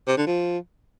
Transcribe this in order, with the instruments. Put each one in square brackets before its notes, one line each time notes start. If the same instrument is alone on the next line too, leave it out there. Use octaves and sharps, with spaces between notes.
[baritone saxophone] C3
D3
F3